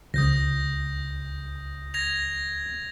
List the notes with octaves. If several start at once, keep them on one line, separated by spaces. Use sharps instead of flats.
C#2 D#6 G6 A#6
G#6 A#6 F7